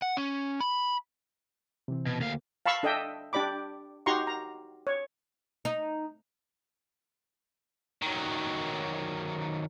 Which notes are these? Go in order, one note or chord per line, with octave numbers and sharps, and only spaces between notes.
F#5
C#4
B5
C3 E3 C4
B2
D2 A#3 F5
F5 A5 B5 C#6 E6
D4 A4 D#5 E5 G5
D4 G4 D5 B5 D6
D#4 F#4 G4 A#5 C6 C#6
A#5
C#5
D#4
D#3 F#3